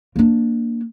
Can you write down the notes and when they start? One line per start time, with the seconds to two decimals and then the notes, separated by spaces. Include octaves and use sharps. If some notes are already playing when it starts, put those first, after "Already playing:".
0.16 A#3 D4